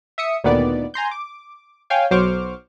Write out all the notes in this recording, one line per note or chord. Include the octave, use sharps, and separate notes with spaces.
E5 D#6 C#7
D2 A#2 D#3 B3 D5
G#5 A#5 C6 G6
D6
C#5 F5 G5 G#5
B1 F#3 C5 C#6 D6 F6